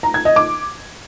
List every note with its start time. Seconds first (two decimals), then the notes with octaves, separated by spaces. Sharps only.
0.03 A#5
0.14 G#6
0.25 D#5
0.36 D6